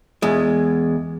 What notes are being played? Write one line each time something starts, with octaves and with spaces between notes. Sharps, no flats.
E2 G#3